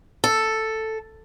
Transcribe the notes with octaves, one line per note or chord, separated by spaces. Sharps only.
A4